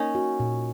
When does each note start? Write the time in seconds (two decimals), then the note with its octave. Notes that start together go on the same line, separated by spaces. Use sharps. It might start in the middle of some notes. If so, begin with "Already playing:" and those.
Already playing: A#3 C#4 D#4
0.15 F#4
0.40 A#2